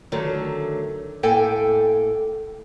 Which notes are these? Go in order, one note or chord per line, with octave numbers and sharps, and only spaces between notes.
D3 D#3 F#3 A3
A2 A#3 A4 G5 G#5